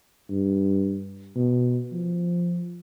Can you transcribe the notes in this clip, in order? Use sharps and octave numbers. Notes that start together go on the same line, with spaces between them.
G2
B2
F3